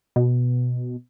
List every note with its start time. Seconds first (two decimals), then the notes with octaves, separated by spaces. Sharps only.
0.16 B2